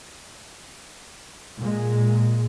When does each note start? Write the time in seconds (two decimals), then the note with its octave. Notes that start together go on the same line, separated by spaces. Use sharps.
1.58 A#2 G#3